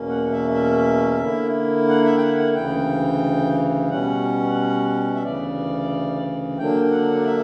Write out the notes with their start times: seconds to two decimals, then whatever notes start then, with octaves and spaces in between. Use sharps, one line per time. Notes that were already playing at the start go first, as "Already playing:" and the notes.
Already playing: E2 B2 A#3 C#4
0.09 F#5
0.31 E5
0.54 E5
1.21 D3 A#3 E4
1.88 F#5
2.05 E5
2.18 G5
2.22 F#5
2.38 F#5
2.55 D2 C#3 E3 G5
3.89 B2 G3 C#4 F#5
5.15 E5
5.24 D2 C#3 E3 D5
6.58 D3 F#3 A#3 D4 G5
6.91 F#5
7.21 D5
7.26 E5